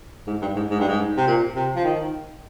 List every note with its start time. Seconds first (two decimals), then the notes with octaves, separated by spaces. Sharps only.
0.27 G#2
0.42 G2
0.56 G#2
0.70 G#2
0.79 G2
0.88 G#2
1.17 C3
1.27 A#2
1.55 C3
1.76 F3
1.84 D#3